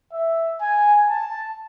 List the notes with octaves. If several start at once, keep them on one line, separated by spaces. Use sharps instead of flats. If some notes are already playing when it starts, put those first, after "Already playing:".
E5
G#5
A5